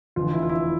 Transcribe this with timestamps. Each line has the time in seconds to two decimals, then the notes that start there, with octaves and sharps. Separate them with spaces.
0.16 F1 E2 D3 F4
0.33 E4
0.43 F4
0.49 E4